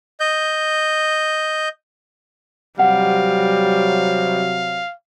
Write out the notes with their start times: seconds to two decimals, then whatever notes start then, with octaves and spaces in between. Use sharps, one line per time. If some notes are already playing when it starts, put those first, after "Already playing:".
0.20 D#5 G6
2.79 C3 F#3 G3 F5 F#5